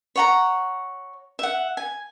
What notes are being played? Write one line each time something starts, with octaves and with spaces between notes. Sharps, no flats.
C#5 F#5 A#5
E5 F#5
G#5